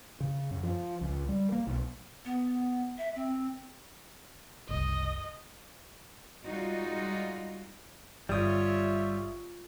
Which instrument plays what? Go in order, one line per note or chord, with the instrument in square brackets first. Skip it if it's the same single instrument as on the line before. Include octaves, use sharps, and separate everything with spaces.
[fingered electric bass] C#3
F#2
F3
C#2
G3
A#3
B1
[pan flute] B3
E5
C4
[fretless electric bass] F#1 C2 [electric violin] D#5
[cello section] G3 G#3 D#4 F4 F#4
[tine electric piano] G1 D#6 [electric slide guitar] G3 [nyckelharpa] F4 C#5 [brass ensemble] E5